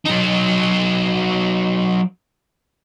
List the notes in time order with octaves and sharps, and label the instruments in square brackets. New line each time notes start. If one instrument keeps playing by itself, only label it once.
[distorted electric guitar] F#3 D#4